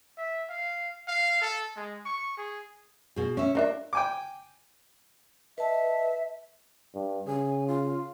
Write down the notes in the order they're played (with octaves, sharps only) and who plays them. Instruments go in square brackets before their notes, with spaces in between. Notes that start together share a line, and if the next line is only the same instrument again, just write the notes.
[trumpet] E5
F5
F5
A4
G#3
C#6
G#4
[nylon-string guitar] B2 G#4
C#4 E5
[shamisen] F3 D4 E5 [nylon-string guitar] A#4
[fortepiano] G5 G#5 D6
[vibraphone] B4 D#5 A5 [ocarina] E5
[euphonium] G2
[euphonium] C#3 [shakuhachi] G#5
[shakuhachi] F4